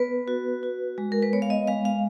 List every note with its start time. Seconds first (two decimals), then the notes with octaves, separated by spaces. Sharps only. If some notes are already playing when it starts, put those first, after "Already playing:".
Already playing: B3 B4
0.28 F#4
0.63 F#4
0.98 G#3
1.12 A#4
1.22 B4
1.33 B3 C#5
1.42 F5
1.50 D#5
1.67 G#3 F5
1.85 F5